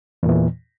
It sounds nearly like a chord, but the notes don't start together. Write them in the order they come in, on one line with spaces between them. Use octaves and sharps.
E2 A#2 E3